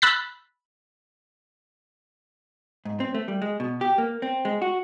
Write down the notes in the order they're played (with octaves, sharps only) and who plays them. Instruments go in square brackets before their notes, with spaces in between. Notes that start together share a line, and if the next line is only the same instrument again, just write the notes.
[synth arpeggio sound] B5 E6 F#6 A6 B6
[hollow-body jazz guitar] G#2
C4
A3
G3
G#3
B2
G4
A#3
C4
G#3
F#4